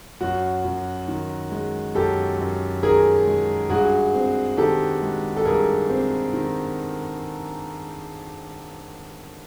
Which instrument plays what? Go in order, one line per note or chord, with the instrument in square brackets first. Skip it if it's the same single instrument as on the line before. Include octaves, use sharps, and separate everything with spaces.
[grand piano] F#2 F#4
F#2
D#3
G#3
F#2 G4 A4
F#2
D#3 G#4 A#4
G#3
G2 F#4 G#4
C4
D#3 G4 A4
G#3
A4
G2 G#4 A#4
C4
D#3